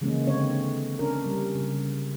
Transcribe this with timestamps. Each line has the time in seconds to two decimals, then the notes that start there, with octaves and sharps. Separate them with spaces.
0.01 C#3 E3 G#3 A#3 C#4
0.27 D3 C4 C#5
0.99 C#4 D4 A#4
1.26 G3
1.55 C#3